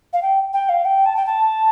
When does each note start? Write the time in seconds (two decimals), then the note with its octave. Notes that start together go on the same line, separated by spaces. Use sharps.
0.13 F5
0.22 G5
0.53 G5
0.69 F5
0.85 G5
1.06 A5
1.16 G5
1.26 A5